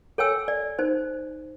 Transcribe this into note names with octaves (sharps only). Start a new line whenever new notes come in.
A4 C#5 G5 G#5 E6
D5
D#4 C5